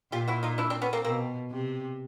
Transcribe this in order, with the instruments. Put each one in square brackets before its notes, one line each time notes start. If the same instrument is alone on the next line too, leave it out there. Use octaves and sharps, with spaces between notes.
[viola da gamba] A#2 [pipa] F4 G4
[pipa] E4 F#4
D#4 F4
D4 E4
C4 D4
B3 C#4
A#3 C4
[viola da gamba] B2 [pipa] A#3 C4
[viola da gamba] C3